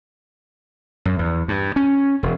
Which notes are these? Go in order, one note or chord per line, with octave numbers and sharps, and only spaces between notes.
F#2
E2
G2
C#4
E1